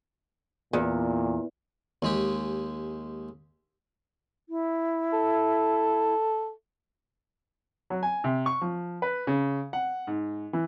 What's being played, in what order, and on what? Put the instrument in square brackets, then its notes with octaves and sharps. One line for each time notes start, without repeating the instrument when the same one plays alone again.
[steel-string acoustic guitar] E2 [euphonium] A#2
[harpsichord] D#2 G#3 G4
[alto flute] E4
[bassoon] A4
[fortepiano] F#3
G#5
C3
C#6
F3
B4
C#3
F#5
G#2
E3